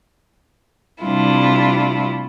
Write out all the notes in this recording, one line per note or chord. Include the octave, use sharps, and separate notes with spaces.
C3 G3 A3 D4 E4 F4